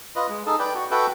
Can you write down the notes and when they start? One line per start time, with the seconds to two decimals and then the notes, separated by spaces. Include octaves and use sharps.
0.16 F4 B4 D#5
0.29 G#3
0.46 D#4 G#4 A4
0.59 B4 D5 G5
0.75 F#4
0.91 F#4 A4 B4 E5 G5